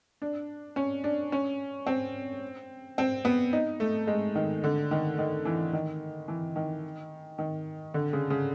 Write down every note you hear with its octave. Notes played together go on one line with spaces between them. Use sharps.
D4
C#4
D4
C#4
C4
C4
B3
D#4
A3
G#3
D#3
D3
D#3
D#3
E3
D#3
E3
D#3
D#3
D3
C#3
C#3